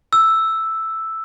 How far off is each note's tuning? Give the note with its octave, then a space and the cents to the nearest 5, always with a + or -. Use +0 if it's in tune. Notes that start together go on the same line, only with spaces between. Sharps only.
E6 +0